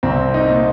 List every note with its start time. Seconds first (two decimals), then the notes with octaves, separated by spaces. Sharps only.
0.03 C2 C4
0.34 D#4
0.49 A#2